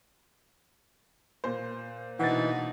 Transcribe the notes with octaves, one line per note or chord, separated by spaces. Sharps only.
A#2 C5
B2 E3 D4 D#4 F#5 A6